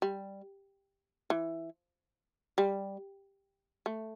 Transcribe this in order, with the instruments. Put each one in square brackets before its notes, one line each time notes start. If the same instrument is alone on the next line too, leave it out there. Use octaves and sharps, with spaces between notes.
[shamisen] G3
E3
G3
A3